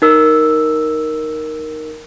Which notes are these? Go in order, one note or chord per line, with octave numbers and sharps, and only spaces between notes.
D#4 A#4 E6